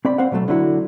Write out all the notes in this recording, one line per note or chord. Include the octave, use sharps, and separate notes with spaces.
C4 D5 B5
C4 C5 F5 F#5
B2 F#3 A3
D3 F#3 E4 F#4